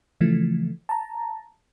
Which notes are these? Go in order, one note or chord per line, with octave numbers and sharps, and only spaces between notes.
C#3 E3 F3 A3
A5 A#5